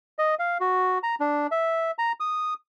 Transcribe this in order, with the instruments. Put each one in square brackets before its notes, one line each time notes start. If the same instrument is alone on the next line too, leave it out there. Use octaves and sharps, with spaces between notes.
[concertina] D#5
F5
F#4
A#5
D4
E5
A#5
D#6